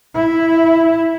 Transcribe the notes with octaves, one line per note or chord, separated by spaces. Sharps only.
E4